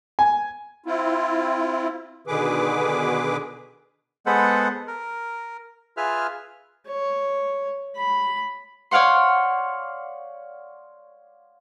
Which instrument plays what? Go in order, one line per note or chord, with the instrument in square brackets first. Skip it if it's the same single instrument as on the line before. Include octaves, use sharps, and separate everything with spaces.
[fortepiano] G#5
[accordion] C4 E4 F4
B2 D3 D#3 G#4 B4 D6
[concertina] G#3 B3 A4 B4 C5 F#5
A#4
F4 G#4 B4 E5 F6
[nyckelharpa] C#5
B5
[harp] C#5 D5 F5 F#5 C6